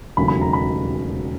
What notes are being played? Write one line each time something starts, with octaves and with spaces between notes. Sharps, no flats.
E1 D#2 C#3 F#3 A3 B5
B5
A#5
B5